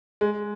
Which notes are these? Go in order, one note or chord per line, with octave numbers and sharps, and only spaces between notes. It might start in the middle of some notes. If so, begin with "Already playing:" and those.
G#3